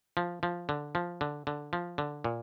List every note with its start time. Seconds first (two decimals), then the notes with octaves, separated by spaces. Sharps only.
0.17 F3
0.43 F3
0.69 D3
0.95 F3
1.21 D3
1.47 D3
1.73 F3
1.98 D3
2.24 A#2